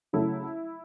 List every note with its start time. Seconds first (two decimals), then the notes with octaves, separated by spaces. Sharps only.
0.13 C#3 F#3 A3 E4